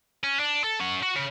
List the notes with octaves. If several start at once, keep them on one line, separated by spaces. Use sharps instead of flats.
C#4
D4
A4
C#4 F#5
F#4
C#3